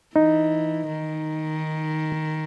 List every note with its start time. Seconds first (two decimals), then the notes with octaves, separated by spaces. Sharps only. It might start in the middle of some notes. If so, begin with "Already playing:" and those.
0.16 E3 D#4
0.89 D#3